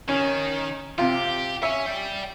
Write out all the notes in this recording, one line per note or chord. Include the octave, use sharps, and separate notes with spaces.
D#3 C#4
C3 F4 G4
C#5 E5 G#5
D5 G5